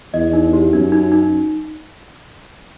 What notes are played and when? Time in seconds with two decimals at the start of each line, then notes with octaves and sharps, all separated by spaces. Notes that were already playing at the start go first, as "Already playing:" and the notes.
0.14 E2 D#5
0.33 D#4
0.53 G4
0.73 F#2 D#4
0.92 D#4
1.12 D#4